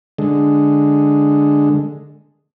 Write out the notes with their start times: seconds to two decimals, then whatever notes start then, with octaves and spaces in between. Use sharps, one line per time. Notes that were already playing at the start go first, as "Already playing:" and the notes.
0.18 D3 G#3